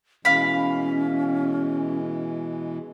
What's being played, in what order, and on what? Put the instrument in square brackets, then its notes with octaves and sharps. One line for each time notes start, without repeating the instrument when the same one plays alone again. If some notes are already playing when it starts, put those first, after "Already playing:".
[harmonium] B2 E3 G#3 [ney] C#4 [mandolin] F5 B5